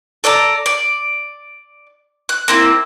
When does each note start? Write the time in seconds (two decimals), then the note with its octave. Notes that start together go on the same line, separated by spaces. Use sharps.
0.24 A4 D5 A5 A#5
0.66 D5
2.29 F#6
2.48 A#3 C4 E4